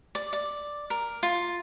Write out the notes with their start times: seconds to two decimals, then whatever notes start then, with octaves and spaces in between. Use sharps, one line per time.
0.15 D5
0.33 D5
0.90 A#4
1.23 F4